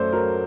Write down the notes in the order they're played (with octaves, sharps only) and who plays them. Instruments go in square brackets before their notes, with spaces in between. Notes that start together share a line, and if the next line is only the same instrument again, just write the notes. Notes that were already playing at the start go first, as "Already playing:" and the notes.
Already playing: [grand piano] F#2 A3 C5 D5
F#3 A#4